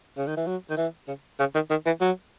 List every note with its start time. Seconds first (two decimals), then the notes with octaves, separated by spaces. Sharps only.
0.17 C#3
0.27 D#3
0.37 E3
0.47 F#3
0.70 D#3
0.77 E3
1.08 C#3
1.39 C#3
1.55 D#3
1.70 D#3
1.86 E3
2.01 F#3